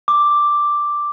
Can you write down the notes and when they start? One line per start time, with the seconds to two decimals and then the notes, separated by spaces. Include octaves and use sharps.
0.08 D6